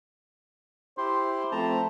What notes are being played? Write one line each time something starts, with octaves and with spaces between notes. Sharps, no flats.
E4 G4 C5 C6
F3 A3 C4 A5 A#5